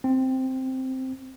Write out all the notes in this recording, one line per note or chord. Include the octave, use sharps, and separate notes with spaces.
C4